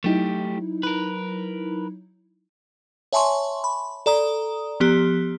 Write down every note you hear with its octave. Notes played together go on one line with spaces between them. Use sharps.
F#3 A3 D#4 E4 G4
A#4 B4
C#5 E5 G#5 A5 C6 C#6
B5
A4 D5 A#5 D#6
F3 B3 G4